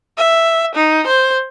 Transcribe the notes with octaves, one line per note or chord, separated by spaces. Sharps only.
E5
D#4
C5